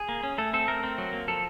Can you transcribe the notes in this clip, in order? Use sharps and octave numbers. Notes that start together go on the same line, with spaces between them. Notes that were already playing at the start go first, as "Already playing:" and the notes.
Already playing: G#4
A#3
C#4
A3 A4
C4 A4
A3 A#4
C4
F#3
A#3
F3 A4